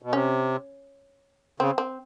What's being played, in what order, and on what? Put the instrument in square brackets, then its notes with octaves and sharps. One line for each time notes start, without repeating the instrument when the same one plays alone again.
[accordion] B2
[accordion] C3 [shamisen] C#4
[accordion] C#3 [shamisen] C4
[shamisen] C4